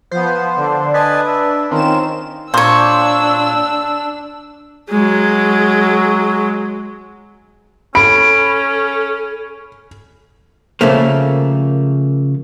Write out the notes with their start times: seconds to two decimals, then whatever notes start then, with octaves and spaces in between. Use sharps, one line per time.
0.11 F3 B3 C5
0.56 D3 D4
0.94 D4 B4 D#5 G#5 A5
1.27 E5
1.71 D#3 C4 C#4 F4 A#4 E7
2.54 A#2 D4 C5 C#5 E6
4.90 F#3 G#3
7.95 C#4 A4 B5 D7
10.81 C#3 F3 A3 A#3